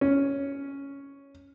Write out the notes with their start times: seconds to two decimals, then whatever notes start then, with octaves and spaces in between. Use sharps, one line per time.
0.01 C#4